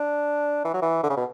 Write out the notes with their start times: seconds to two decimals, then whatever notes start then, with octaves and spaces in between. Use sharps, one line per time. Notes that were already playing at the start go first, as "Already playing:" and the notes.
Already playing: D4
0.65 E3
0.73 F#3
0.82 E3
1.03 D3
1.10 C#3
1.17 B2